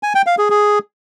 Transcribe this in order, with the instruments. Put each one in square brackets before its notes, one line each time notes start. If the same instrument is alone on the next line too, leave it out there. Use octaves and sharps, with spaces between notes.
[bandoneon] G#5
G5
F5
G#4
G#4